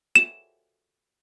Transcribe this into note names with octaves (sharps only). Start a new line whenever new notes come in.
E7